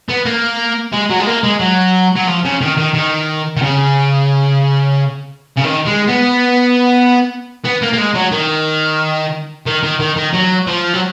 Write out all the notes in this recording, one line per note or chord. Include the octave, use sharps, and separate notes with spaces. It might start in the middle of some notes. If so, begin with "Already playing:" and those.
B3
A#3
G#3
F#3
G#3
A#3
G#3
F#3
F#3
F3
C#3
D#3
D#3
D#3
D#3
C#3
C#3
D#3
G#3
B3
B3
A#3
A#3
G#3
F#3
D#3
D#3
D#3
D#3
D#3
F#3
F3
F#3